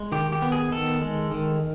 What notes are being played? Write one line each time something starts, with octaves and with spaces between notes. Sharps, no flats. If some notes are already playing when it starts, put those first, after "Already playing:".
Already playing: G#3
D#3 G4
G4
B3
G#4
D#3 A4
G#3
D#3